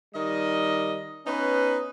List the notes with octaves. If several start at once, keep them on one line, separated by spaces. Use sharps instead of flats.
D#3 G3 D#5
B3 C#4 D#4 B4